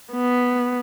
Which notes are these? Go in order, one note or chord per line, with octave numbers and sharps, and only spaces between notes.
B3